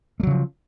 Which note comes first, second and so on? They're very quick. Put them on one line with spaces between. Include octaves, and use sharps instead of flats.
A3 F#3 C#3 F3